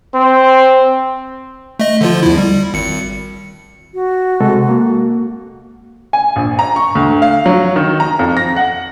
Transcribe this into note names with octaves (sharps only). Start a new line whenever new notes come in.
C4
A3 D#5
D3 F3 F4
E2 E4
G3
G#1 C#7
F#4
C3 G#3 A4
A#3
G#5
A#1
A#5
C#6
D2
F5
F#3
D#3
A#5
F2
A#6
F#5